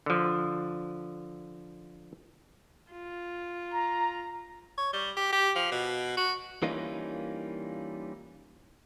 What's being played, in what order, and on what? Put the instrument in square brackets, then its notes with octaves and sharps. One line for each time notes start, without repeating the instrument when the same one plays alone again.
[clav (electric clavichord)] D3 F3
[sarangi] F4
[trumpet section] A#5
[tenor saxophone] C#5
G3
G4
G4
F3
B2
F#4
[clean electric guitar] E3 G3 A#3 C#4 D#4 F4